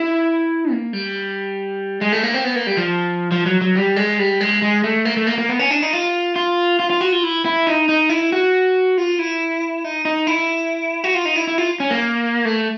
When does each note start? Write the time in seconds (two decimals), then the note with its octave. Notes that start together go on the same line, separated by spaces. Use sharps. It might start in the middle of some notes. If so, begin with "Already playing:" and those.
Already playing: E4
0.71 A#3
0.93 G3
2.01 G#3
2.12 A3
2.23 A#3
2.34 C4
2.44 B3
2.56 A#3
2.67 G3
2.77 F3
3.31 F3
3.46 F#3
3.61 F#3
3.75 G3
3.96 G#3
4.19 G3
4.41 G#3
4.62 G#3
4.84 A3
5.05 A#3
5.16 A3
5.27 A#3
5.38 A#3
5.49 B3
5.59 C#4
5.71 D4
5.82 D#4
5.93 F4
6.36 F4
6.79 F4
6.90 F4
7.01 F#4
7.12 F4
7.23 E4
7.45 E4
7.67 D#4
7.89 D#4
8.09 E4
8.32 F#4
8.98 F4
9.19 E4
9.84 D#4
10.05 D#4
10.27 E4
11.04 F#4
11.14 F4
11.25 D#4
11.36 E4
11.47 E4
11.58 F4
11.80 C#4
11.91 A#3
12.45 A3